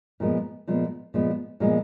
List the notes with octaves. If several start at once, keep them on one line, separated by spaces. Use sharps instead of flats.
A#2 F3 G#3 B3
A#2 F3 G#3 B3
A#2 F3 G#3 B3
A#2 F3 G#3 B3